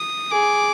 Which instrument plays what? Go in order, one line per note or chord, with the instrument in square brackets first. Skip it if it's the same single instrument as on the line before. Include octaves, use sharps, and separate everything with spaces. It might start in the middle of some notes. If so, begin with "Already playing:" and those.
Already playing: [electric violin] D#6
[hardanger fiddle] G#4 [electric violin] D6